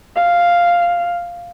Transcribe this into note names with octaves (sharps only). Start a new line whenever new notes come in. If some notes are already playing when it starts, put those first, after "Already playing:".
F5